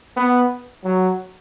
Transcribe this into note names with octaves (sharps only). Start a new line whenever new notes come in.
B3
F#3